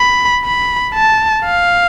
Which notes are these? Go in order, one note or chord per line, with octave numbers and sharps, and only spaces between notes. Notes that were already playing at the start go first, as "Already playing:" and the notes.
Already playing: B5
B5
A5
F5